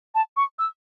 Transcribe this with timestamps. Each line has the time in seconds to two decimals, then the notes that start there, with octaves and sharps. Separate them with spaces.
0.15 A5
0.37 C#6
0.59 E6